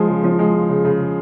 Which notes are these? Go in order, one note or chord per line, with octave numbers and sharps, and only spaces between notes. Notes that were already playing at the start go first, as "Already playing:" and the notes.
Already playing: F3 G#3
C#3
F3
G#3
C#3
C#3
C#3